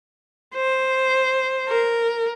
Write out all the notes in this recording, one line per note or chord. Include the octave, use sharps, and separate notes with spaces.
C5
A#4